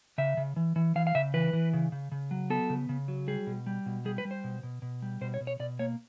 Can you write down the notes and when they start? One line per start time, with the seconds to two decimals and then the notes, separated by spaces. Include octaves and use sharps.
0.18 C#3 E5
0.37 C#3
0.56 E3
0.76 E3
0.95 E3 F5
1.07 F5
1.15 C#3 E5
1.34 E3 B4
1.53 E3
1.73 C#3
1.92 C#3
2.12 C#3
2.31 F#3
2.50 B3 A4
2.70 C#3
2.89 C#3
3.08 F#3
3.28 G3 G#4
3.47 B2
3.66 G3
3.86 B2
4.05 G3 G#4
4.18 B4
4.25 G3
4.31 C5
4.44 B2
4.63 B2
4.82 B2
5.02 G3
5.21 B2 C5
5.34 C#5
5.41 B2
5.47 C#5
5.59 B2 D5
5.79 A#3 C#5